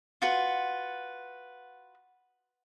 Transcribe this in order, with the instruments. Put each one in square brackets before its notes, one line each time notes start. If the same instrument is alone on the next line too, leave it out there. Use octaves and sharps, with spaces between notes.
[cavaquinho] F4 F#4 B4